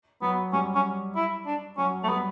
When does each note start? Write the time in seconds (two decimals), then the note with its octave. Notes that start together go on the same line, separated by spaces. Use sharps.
0.22 F#3 B3
0.53 G3 C#4
0.75 C#4
1.16 E4
1.46 D4
1.77 F#3 C#4
2.03 A3
2.08 G3 B3